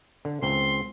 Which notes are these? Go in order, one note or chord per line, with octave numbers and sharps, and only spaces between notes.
D3
C#2 C4 C6